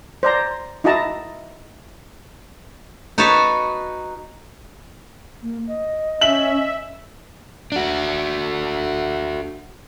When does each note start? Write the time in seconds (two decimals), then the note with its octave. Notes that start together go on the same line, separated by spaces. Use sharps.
0.23 C5 D5 A#5
0.84 D#4 E4 F#4 D#5 A5 A#5
3.18 D#4 F#4 B4 C#5 A5
5.42 A#3
5.67 D#5
6.21 C#4 E5 F#7
7.72 D4 F#4